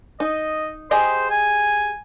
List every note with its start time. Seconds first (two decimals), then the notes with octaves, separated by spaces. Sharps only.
0.20 D#4 D#5
0.91 G4 G#4 C5 D#5
1.30 G#5